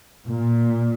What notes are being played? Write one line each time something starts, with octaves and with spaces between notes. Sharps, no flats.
A#2